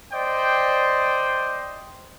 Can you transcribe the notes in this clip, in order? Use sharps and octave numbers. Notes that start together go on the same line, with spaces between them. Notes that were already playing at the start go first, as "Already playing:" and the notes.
C5 D5 D#5 G5